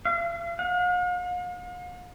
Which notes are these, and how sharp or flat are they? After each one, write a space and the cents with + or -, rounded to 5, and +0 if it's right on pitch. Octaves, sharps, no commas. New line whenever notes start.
F5 -45
F5 +45